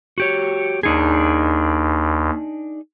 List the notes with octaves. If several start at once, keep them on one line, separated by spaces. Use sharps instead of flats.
F#4 G4 C#5
D#2 D4 D#4 G#4